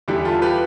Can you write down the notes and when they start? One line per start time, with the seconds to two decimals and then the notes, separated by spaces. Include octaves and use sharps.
0.08 E2 D3 G3 E4 G4
0.25 F4 A4
0.42 G4 B4